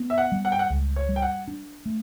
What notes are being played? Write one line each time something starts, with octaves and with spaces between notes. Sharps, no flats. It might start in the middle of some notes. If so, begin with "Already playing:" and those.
Already playing: B3
E5
F#5
G3
F#5
G5
F#5
C#2
C#5
G3
G5
F#5
D4
A3